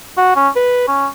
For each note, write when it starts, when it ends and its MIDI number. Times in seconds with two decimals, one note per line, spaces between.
0.17 0.34 66
0.36 0.49 61
0.56 0.86 71
0.88 1.07 61